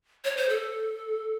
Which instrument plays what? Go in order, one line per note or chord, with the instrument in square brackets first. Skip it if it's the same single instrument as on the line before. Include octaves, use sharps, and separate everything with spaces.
[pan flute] C#5
C5
A4